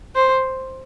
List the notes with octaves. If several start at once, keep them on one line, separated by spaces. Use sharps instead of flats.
C5